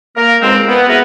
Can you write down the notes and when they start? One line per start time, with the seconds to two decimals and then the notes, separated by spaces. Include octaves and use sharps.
0.16 A#3 A#4
0.41 C#2 G#2 G#3 C4
0.68 B3
0.89 E4 F#4 G#4 A#4 B4